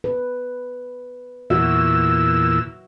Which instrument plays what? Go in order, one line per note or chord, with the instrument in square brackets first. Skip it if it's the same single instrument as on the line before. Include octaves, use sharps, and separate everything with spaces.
[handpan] B4
[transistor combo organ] E2 A#2 E6 [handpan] F#4 E5